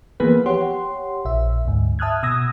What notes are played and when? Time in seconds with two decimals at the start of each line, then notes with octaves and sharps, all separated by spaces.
0.20 E3 F3 A#3 B3 G#4 B4
0.46 G4 C#5 F#5 C6
1.25 A#1 E5
1.65 D2 G#2
1.99 E5 A5 D#6 F6 F#6 G#6
2.23 B2 D#6 E6 G#6 A#6